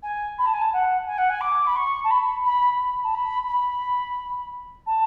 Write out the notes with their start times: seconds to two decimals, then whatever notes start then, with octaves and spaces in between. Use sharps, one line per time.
0.03 G#5
0.38 B5
0.46 A5
0.53 G#5
0.61 A5
0.73 F#5
1.06 G#5
1.18 F#5
1.30 G#5
1.41 D6
1.67 B5
1.76 C#6
2.04 A5
2.11 B5
2.45 B5
2.80 B5
3.04 A5
3.14 B5
3.48 B5
4.86 A5